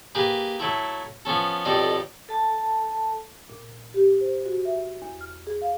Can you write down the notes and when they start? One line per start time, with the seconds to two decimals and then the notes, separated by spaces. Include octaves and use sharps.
0.15 A#3 G4 G#4 B4
0.60 F#3 A3 E4
1.25 F3 B3 C#4 A4
1.65 B1 F2 G3 A4 D5 D#5
2.29 A4 A5
3.50 A#2
3.94 G4
4.21 C5
4.46 F#4
4.65 E5
5.02 E2
5.21 F6
5.47 G#4
5.62 F5